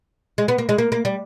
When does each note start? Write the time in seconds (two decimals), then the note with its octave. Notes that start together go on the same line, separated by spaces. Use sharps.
0.38 G#3
0.48 B3
0.58 A#3
0.69 G#3
0.78 A#3
0.92 A#3
1.05 G3